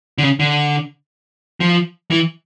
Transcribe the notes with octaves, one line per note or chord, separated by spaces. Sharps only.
D3
C#3
D3
F3
E3